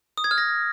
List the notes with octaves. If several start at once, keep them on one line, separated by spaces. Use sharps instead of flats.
D#6
G#6
F6
A#6